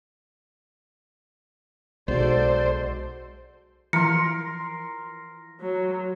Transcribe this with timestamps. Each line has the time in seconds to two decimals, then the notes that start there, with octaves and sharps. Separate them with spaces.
2.08 B1 G#3 F#4 A4 C5 D5
3.93 E3 F3 A#4 C6 C#7
5.61 F#3